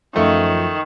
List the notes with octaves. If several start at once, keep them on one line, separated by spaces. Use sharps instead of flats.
F#2 D#3 F3 A3